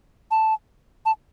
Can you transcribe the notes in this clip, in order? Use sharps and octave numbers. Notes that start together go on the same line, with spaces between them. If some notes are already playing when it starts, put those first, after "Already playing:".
A5
A5